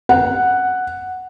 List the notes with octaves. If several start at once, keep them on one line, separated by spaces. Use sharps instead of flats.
F#5